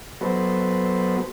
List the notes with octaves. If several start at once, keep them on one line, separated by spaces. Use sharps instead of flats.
F#3 B3 F#4 A4 B4 C5